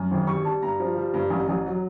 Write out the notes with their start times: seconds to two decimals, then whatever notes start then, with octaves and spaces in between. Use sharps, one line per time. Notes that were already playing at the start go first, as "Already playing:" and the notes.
Already playing: F#2
0.11 G#1
0.27 G3 C#6
0.44 G3 A5
0.62 G2 A#5
0.80 F3
0.96 G3
1.14 G2
1.30 A1
1.49 A1
1.66 F#3